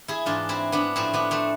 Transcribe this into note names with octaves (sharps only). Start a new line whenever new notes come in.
E4 G#4
G#2 E3 D4 F4
C4 E4
B3 D4
A2 F3 C4 E4
B3 D4
A3 C4